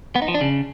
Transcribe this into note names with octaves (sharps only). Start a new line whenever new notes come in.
B3
D#4
F3
D4
C#3